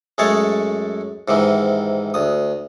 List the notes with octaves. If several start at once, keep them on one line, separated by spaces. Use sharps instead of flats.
F#2 G#3 A3 G#4 C#5 A5
G#2 C3 D#3 E3
D2 D#6